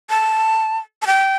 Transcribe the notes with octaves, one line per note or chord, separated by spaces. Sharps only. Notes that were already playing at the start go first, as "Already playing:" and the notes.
A5
A5
G5